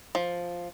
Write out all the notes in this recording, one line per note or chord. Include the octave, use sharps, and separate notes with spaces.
F3